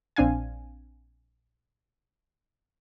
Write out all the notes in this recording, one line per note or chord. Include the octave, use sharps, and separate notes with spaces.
A#1 C4 D4 F5 G#5